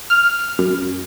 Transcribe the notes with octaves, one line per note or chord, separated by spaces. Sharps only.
F6
F#2